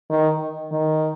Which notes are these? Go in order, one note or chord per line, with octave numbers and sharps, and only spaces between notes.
D#3
D#3